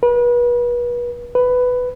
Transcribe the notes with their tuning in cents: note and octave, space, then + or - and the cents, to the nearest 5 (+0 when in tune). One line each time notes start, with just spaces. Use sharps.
B4 -35
B4 +10